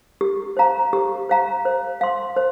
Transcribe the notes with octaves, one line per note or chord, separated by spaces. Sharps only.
G4
C5 F5 A#5
G4
C5 F5 A#5
C5
F5 C6
C5